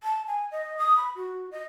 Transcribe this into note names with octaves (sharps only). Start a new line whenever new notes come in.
A5
G#5
D#5
D#6
B5
F#4
D#5